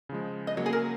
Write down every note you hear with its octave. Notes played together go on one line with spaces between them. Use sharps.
C#3 F3 G#3
D#5
C#3 F#3 A#3 C#5
G#4
A#4